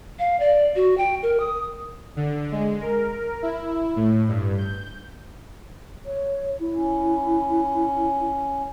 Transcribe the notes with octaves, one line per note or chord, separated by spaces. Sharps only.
F5
D5
F#4
G5
A#4
D#6
D3
G#3
A#4
E4
A2
G2
G6
C#5
E4
C#4